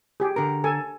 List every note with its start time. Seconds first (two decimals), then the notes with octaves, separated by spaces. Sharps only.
0.20 G4 G#4
0.36 D3 A#4
0.64 A4 G#5